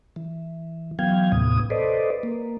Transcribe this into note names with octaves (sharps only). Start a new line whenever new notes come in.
E3
E3 F#3 B3 F5 G5 G#6
D#2 A2 C3 B3 D#6
A4 B4 C5 D5 D#5
A#3